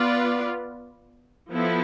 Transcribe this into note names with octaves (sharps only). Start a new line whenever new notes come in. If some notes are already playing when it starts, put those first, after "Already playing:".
Already playing: B3 F4 B4 D5
F3 B3 E4 A4